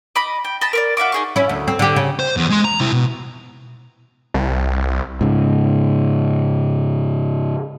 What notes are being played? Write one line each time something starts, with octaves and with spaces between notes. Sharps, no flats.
D#5 B5 D6
G5
D#5 A5 B5
A#4 B4 D5
F#4 E5 F5 D6
D#4 G#4 C#6
C#4 E4
D2
C4
D3 G4
C#3
C5
E2
G#3 C6
A#5
C3 E4
B2
C2
G#2 C#3